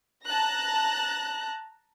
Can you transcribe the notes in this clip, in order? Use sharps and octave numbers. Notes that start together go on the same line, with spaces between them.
A5 A#5 F#6 A#6